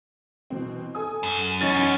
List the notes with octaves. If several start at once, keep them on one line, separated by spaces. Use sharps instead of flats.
B2 E3 C4
A4 G#5 D#6
F#2
E2 C#4 D#4 A6